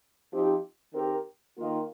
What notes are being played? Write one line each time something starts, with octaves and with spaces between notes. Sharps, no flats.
F3 C4 D#4 G4
D#3 C4 G4 A#4
D#3 A#3 F4